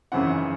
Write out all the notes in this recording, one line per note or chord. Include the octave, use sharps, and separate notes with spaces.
G#1 F#2 C#3 E3 C4 F#5